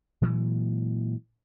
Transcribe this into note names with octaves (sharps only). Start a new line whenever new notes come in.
A#2 E3 F#3 G#3